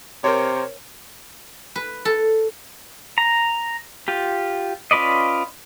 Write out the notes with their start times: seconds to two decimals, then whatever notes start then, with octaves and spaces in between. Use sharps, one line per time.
0.24 C3 A#4 C5 C#5
1.76 B4
2.05 A4
3.18 A#5
4.08 F4 G4
4.91 C#4 F4 B4 D5 D#5